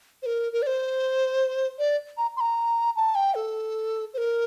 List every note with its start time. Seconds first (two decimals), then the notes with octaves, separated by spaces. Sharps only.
0.22 C5
0.26 A#4
0.52 A#4
0.62 D5
0.67 C5
1.79 D5
2.17 A#5
2.37 C6
2.40 A#5
2.96 A5
3.15 G5
3.35 A4
4.14 C5
4.18 A#4